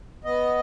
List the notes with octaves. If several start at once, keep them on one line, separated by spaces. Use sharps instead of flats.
B3 D#5